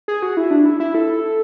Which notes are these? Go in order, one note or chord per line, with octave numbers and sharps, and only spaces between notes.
G#4
F#4
E4
D4
E4
E4
A4